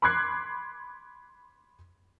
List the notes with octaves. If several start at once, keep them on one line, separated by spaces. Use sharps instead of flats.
B5 C6 D6 F#6 G#6 C7